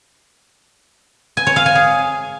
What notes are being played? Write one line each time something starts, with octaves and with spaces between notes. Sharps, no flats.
G#5
C#5
F5
G#5
G#4